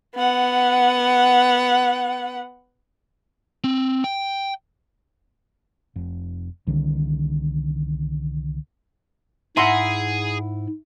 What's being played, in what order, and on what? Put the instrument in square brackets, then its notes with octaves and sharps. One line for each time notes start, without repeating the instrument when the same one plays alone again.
[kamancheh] B3 F#5
[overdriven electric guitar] C4
G5
[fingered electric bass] F1
C2 D3 D#3
[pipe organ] G#2 [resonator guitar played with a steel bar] E4 F#5 [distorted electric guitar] G#4 [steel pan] E5 A#5 C6